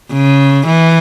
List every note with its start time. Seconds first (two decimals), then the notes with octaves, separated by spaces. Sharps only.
0.13 C#3
0.67 E3